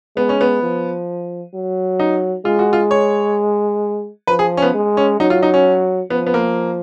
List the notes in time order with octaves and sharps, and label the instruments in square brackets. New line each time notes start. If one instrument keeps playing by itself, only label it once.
[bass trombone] G#3 [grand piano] B3
[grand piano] C#4
B3
[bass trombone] F3
F#3
[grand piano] D#4
[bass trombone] G#3 [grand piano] F4
[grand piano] F#4
F4
C#5
[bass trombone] F3 [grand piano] B4
[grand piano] G#4
C#4
B3
[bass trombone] G#3
[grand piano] C#4
[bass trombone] F#3 [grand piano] D#4
[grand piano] F4
D#4
C#4
[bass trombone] F3 [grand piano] B3
[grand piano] B3
A#3